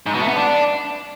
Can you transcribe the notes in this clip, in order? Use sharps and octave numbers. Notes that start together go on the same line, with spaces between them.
G#2
B2
A3
B3
D4